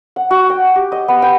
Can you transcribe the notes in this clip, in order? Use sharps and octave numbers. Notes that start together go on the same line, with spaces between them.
F#5
F#4
G5
G4
D#5
B3
G5